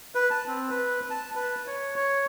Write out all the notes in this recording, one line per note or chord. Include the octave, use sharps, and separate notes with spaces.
B4
A5
C4
B4
A5
B4
C#5
C#5